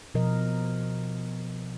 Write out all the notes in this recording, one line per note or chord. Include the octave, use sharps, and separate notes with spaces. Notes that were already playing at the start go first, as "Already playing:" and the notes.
B2 F3 A#4 D#5